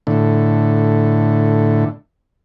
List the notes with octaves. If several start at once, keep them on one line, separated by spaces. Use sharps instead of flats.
A2 D3